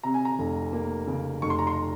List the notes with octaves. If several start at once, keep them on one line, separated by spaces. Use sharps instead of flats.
C3 A#5
G#5
A#5
F1
A#3
C#3
F1 C#6
C6
A#5
C6